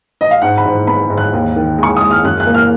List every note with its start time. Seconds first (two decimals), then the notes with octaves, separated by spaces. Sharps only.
0.21 D#5
0.31 F5
0.42 G#2 F#5
0.58 B5
0.65 G#2
0.87 B3 B5
1.10 G#2
1.18 F#6
1.33 D#2
1.56 D#3
1.78 G#3 C#6
1.97 G#3 D#6
2.11 F6
2.24 F#2 F#6
2.40 F#6
2.47 A#3
2.55 F6